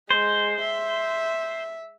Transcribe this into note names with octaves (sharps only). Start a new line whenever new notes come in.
G#3 C5
E5